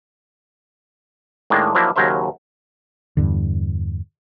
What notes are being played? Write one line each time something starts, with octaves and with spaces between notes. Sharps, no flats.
A2 D#3 G#3 A#3 D4
F3 F#3 A#3 D4 E4
D#2 C#3 F#3 A#4 C5 E5
E2 G2 D3